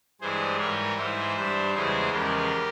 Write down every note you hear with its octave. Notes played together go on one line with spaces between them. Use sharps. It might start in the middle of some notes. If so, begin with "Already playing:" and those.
G2 E3 G#3 G#4 C5
G#2 E3 G3 A#4 C#5
G#2 E3 G#3 C5 E5
G2 G3 C5 E5
E2 C#3 E3 G#3 G#4 C5
E2 C#3 F3 G#3 G4 A#4